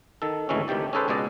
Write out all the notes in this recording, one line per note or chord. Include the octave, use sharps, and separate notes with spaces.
D#3 A4
G#1 D2 E3 G#3 C#4
D2 C3 D#3 G4 D5
C#4 G#4 A4 B4 C5
C#2 B2 G#3 D5 D#5